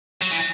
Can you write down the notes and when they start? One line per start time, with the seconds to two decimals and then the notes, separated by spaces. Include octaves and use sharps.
0.21 F#3
0.31 E3